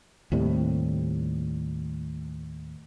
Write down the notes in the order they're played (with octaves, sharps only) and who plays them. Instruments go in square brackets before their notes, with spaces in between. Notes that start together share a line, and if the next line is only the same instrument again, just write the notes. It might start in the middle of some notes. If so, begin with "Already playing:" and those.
[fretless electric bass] D#2 A2 C3 G3